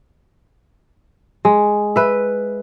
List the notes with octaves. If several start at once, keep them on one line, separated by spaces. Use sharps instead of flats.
G#3
B4 E5